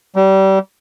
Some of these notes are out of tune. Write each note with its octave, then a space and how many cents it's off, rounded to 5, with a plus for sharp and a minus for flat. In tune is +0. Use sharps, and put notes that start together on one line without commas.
G3 -30